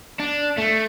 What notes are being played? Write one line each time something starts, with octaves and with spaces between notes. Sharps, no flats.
D4
A3